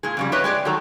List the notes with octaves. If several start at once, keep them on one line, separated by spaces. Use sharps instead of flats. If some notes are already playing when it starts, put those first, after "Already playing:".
A#2 G#3 G#4
F2 C#3 G3
G4 B4 C#5 D#5 E5
G#3 G4 G#4 D5
D#3 F#3 A4 A#5